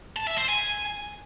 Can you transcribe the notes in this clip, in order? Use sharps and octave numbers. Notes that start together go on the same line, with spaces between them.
A5
E5
C5
G#5